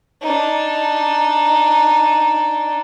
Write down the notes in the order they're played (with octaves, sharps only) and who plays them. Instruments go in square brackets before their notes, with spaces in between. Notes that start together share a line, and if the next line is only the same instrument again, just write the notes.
[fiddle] D4 D#4